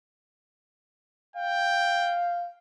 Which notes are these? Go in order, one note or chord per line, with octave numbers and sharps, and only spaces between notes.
F5 G5